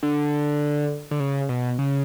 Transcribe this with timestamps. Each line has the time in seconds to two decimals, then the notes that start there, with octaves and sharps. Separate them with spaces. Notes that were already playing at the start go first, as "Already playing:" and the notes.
0.03 D3
1.11 D3
1.20 C#3
1.49 B2
1.79 C#3